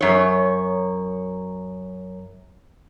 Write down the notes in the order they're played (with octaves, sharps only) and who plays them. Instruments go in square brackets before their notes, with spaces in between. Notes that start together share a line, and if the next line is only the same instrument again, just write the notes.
[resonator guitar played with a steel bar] F#2 C#5